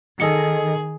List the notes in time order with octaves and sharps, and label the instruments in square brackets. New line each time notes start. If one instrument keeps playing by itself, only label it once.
[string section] D#3 [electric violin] G#4 [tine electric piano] A4 D#5 C#7